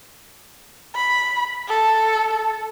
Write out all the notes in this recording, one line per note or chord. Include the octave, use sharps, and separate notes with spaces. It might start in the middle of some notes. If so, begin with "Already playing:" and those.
B5
A4